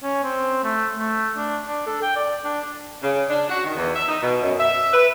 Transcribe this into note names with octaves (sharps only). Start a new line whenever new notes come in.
C#4
C4
A3
A3
D4
D4
A4
G5
D5
D4
C#3
D4
F#4
D#3
E2
E5
D#4
B2
F#2
E5
B4